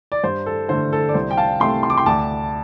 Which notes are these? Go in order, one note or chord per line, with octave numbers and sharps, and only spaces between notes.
D5
G2 C5
A4
D3 A3 C5
A4
D5
C2 C5
G5
F5 A5
C3 A3 G5 C6
C6
D6
G5 C6
D2 A5 D6